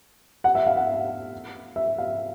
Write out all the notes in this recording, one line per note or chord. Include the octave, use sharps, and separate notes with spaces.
F#5
E5
F5
F#5
E5
F5